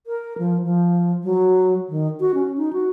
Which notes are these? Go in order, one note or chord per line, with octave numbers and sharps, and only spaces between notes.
A#4
F3
F3
F#3
D#3
F#4
C#4
D#4
F#4